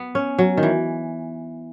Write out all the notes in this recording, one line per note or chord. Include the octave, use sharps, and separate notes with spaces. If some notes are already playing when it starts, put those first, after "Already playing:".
Already playing: B3
C#4
F#3
D#3
E3